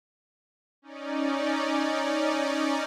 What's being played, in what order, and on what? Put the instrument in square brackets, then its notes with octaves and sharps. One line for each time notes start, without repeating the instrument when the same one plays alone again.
[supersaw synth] C#4 D#4 D5